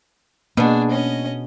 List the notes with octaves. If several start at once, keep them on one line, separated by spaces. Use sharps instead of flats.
B2 A#3 B3 D4 G#4
C#4 D#5